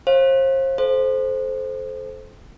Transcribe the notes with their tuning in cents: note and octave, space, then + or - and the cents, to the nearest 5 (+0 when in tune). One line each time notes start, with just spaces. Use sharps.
C5 +35 F5 +0
A4 -30 C5 +0